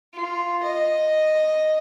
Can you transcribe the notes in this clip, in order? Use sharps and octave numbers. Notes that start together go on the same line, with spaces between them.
F4
D#5